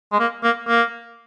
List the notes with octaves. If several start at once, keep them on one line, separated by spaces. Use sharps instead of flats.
G#3
A#3
A#3
A#3